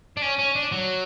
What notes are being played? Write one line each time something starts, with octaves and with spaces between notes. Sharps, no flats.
D4
C#4
C#4
D4
F#3